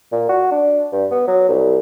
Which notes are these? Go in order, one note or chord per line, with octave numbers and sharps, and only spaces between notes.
A#2
F#4
D4
G2
B3
F#3
C2